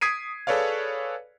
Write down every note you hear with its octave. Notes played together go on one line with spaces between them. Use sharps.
D#6 G#6 B6 C7 D7 D#7
G#4 A4 B4 C#5 D5 F5